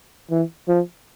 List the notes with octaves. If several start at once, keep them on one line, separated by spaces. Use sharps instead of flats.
E3
F3